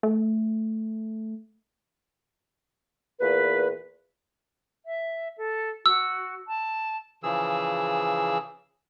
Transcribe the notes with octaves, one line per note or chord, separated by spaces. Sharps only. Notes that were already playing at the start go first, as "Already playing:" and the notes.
A3
E2 A#2 B4
E5
A4
F#4 E6
A5
C#3 E3 F3 G#4 E6